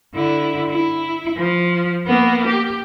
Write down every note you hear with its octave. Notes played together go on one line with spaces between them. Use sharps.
D3 E4
E4
F3
A#3 B3
G4